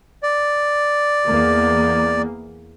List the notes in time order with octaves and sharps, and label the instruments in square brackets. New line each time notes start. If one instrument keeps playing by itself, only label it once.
[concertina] D5
[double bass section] E2 A#3